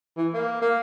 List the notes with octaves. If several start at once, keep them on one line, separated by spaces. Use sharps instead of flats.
E3
A#3
A#3